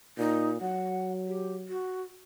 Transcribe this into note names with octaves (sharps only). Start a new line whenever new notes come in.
A#2 D#4
F#3 F#5
G4
F#4